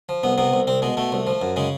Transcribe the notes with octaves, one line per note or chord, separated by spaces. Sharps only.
F3
C2 B3
C3 B3
C2
C2 C4
B2 G#3
B2 A3
C2
F3
F#2
C#3 G#3